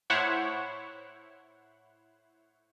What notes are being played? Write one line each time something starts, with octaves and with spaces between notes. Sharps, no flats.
A2 E4 C5 C#5 F#5